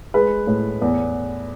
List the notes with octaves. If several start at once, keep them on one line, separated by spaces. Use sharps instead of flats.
G#3 B4
A2
E2